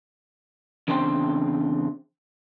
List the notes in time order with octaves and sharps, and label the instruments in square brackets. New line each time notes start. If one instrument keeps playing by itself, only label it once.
[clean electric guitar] E2 C#3 C4 D4 C5 G5